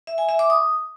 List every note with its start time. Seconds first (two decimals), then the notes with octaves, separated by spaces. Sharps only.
0.07 E5
0.18 G#5
0.29 E5
0.39 D6
0.50 D#6